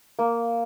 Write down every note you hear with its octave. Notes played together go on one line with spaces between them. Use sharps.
A#3